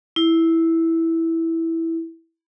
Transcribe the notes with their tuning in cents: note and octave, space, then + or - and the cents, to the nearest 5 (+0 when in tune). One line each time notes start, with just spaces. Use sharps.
E4 -5